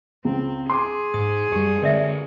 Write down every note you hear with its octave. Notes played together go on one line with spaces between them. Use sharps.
C#2 C4
G#4 C6 D6
G#2 D#6
F#2 G3 G4
D3 G#3 C4 A#4 D5 E5